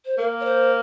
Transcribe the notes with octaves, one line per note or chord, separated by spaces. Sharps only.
C5
A#3 A#4
C#5
C5